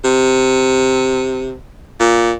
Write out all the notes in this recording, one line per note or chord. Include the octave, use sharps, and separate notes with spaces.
C3
A#2